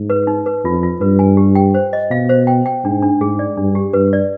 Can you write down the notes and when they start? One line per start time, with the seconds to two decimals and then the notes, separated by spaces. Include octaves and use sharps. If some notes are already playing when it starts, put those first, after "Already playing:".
Already playing: G#2
0.10 B4
0.27 D#4
0.46 B4
0.65 F2 F4
0.83 F4
1.01 G2 B4
1.19 G#5
1.37 G4
1.55 G5
1.74 C5
1.93 D#5
2.11 B2 F5
2.29 C5
2.47 G5
2.66 G5
2.84 G#2 D4
3.02 D4
3.21 G#2 G#4
3.39 D5
3.57 G2 D4
3.75 G4
3.93 G2 B4
4.13 D5